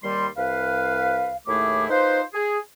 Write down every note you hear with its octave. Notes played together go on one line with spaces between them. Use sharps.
D#2 G3 C6
C2 B4 F5
D#2 A2 A3 E4 G#4 D6
D#4 F4 B4 C5
G#4